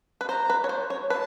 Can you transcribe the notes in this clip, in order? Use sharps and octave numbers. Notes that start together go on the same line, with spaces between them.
B4
C5 A#5
B4
C#5
C5
C#5
B4 A5